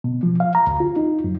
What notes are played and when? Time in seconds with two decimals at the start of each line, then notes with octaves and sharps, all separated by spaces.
0.04 B2
0.23 F3
0.40 F5
0.55 A#5
0.67 D2
0.80 F4
0.96 D#4
1.24 F#2